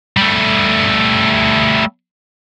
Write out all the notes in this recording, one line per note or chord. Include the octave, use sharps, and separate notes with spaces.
G3 A3